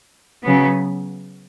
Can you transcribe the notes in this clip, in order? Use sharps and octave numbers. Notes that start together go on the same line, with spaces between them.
C#3 F#3 B3